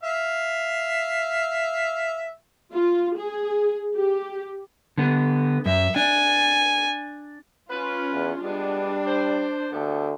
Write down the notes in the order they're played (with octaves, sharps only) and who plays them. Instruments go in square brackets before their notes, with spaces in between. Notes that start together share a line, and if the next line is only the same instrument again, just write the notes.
[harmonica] E5 F5
[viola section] F4
G#4
G4
[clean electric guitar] D3 B3
[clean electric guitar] F#2 [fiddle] E5
[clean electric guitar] D4 [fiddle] G#5
[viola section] C#4 F4 [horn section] B4
[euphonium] E2
[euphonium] G3 [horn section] G#3 B3 [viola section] D4
[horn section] C5
[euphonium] D2 [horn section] B3 G4 A4